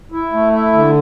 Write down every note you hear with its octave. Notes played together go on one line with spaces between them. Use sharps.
E4
A3
E4
D3